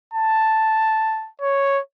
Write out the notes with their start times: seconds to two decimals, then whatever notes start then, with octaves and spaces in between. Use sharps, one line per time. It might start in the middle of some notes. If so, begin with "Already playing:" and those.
0.13 A5
1.41 C#5